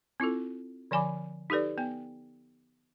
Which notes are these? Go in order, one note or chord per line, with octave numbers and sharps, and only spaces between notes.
C4 E4 F4 A4
D3 F3 D5 G#5 B5 D6
D#4 G4 A4 B4 D5
B3 G5